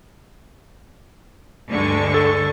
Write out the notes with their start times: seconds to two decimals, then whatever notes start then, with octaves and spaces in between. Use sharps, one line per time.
1.70 D2 G2 D3 G#3 C#6
2.14 A4